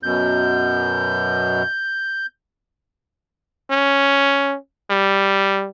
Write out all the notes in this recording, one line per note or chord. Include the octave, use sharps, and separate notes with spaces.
F#2 B2 G6
C#4
G3